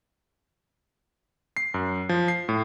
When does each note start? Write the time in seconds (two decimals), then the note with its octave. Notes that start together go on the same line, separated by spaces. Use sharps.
1.57 C7
1.74 F#2
2.09 F3
2.28 C7
2.49 A2